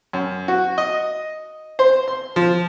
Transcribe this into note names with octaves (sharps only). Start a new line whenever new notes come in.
F#2
F#4
D#5
C5
C6
F3